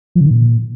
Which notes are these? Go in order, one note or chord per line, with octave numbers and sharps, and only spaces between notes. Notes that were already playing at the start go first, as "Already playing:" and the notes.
F3
C#3
D#3
A#2